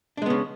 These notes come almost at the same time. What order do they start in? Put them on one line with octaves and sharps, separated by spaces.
D4 G#3 B3 C#3